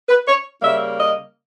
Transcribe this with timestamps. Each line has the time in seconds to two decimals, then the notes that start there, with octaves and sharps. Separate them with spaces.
0.09 B4
0.27 C#5
0.62 C#3 G3 A#3 E5
0.99 D#5